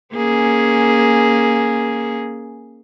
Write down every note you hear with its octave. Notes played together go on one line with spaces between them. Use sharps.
A#3 C#4 G#4